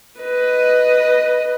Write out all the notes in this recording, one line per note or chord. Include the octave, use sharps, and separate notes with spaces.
B4 D#5